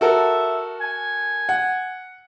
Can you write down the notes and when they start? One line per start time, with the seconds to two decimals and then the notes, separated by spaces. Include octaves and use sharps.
0.01 F#4 A4 A#4 E5
0.81 G#5
1.49 F#5